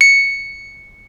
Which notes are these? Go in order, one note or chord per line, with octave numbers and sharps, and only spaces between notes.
C#7